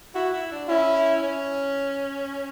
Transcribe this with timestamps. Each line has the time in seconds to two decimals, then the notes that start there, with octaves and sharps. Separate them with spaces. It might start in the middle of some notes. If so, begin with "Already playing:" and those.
0.15 E4 F#4
0.33 E4
0.51 D4
0.68 C#4 E4
1.23 C#4